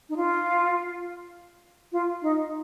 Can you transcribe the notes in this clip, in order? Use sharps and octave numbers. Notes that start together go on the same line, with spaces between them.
D#4
F4
F4
D#4